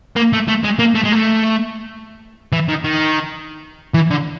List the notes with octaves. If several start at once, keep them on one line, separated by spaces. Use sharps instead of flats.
A#3
A3
A3
G#3
A#3
A3
G#3
A3
E3
D#3
D#3
E3
D3